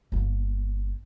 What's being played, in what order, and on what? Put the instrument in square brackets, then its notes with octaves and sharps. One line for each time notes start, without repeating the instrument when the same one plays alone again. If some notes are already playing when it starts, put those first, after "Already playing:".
[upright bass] G1 A#3